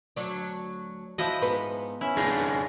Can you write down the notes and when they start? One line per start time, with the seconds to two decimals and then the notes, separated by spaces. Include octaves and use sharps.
0.16 D2 F#3 D4
1.18 F3 E4 F#4 D#5
1.41 G#2 B3 B4
2.01 C#4 E4
2.17 D4 D#4 G#4